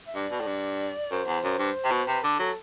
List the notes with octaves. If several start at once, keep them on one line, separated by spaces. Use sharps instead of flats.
E5
G2 D5
B2
A2
G2
F#2 C5
E2
F#2
G2
C3
B2
C3 B4
D3 A4
F#3 A4